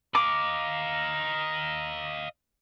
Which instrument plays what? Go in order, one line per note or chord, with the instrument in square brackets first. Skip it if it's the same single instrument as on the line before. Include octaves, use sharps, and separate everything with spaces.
[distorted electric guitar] D#5 F5 [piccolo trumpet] A#5 [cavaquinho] D6